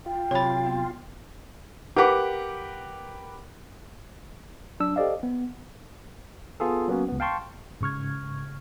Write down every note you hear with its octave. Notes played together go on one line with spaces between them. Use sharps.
F4 G5
C3 F#3 C#5 B5 A6
B3
G4 A#4 B4 F#5 D6
F#3 D4 E6
G4 A4 C5 D5 D#5 F5
B3
B3 F4 G#4 A4
F#3 A#3 B3 C#4 F#4
C#2 B3
F5 G5 A5 C6 C#6
G#2 C#3 C#6 F6 G#6